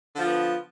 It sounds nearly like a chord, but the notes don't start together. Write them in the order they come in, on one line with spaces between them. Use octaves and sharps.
D3 F3 F4 B3